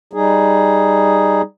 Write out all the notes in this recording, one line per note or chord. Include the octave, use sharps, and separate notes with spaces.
G3 D#4 G#4